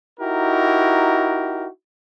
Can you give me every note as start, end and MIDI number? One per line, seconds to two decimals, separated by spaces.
0.20 1.67 63
0.20 1.67 64
0.20 1.67 66
0.20 1.67 67
0.20 1.67 70